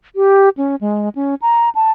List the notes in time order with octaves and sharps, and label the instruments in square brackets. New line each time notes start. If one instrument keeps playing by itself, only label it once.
[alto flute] G4
C#4
G#3
C#4
A#5
A5